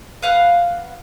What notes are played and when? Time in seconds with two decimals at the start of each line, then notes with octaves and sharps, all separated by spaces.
0.22 B4 F5 F#5 F6